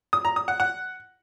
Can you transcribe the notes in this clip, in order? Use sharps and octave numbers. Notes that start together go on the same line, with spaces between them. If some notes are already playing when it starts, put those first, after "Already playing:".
D#6
A#5
D#6
F#5
F#5